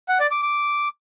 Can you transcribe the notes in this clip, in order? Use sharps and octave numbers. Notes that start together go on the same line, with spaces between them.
F#5
D5
D6
D6